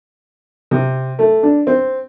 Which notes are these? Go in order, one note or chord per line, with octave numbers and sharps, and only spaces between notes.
C3
A3
D4
C4